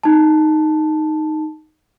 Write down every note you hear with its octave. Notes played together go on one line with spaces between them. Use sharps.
D#4 A5